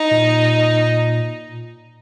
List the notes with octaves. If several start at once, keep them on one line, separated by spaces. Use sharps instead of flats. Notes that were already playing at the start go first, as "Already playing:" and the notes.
Already playing: D#4
A#2